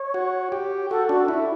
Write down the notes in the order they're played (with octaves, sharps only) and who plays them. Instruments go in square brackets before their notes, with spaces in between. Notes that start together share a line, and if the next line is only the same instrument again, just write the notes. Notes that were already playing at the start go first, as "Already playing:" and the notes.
Already playing: [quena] C#5
[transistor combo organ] F#4
G4
[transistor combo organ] F#4 [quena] A4
[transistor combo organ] D4 [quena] F#4
[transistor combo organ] E4